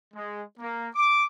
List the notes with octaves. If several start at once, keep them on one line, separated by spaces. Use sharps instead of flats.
G#3
A#3
D6